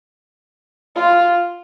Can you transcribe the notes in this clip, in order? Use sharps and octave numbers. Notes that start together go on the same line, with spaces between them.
F4